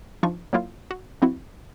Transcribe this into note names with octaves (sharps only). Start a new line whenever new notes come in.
F3 D4 D#4 F4 C#6
F#3 A#3 E4 F4 F5
F#4
F3 C4 E4 F#4